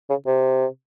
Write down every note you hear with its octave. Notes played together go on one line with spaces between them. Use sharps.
C#3
C3